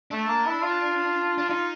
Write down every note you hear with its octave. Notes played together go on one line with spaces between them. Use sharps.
A3 D4
A#3
E4
F4
D4
D#4 F4